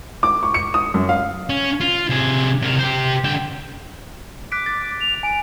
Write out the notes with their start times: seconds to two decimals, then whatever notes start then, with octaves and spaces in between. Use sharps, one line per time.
0.23 D6
0.43 C#6
0.54 C#7
0.74 D#6
0.94 F#2
1.09 F5
1.49 C#4
1.80 F4
2.10 C3 G#4
2.62 C3 A#4
2.79 G4 C5
3.24 D3 G5
4.52 D6 F#6 B6 D7
4.66 A6
5.00 F7
5.23 G#5 D7